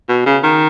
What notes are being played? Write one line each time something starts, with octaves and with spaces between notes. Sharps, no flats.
B2
C#3
D#3